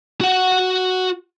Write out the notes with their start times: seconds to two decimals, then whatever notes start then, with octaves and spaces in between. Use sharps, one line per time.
0.21 F#4 F#5